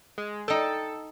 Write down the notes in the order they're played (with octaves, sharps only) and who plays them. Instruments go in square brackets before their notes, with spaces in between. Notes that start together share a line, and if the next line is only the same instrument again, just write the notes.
[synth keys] G#3
[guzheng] D#4 G5 [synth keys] A4